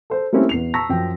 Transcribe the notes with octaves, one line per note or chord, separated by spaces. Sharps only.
A4 C5
G3 A3 A#3 C4 C#4 E4
E2 C7 F7
A5 A#5 C#6 E6 A#6 B6
F#2 F3 G5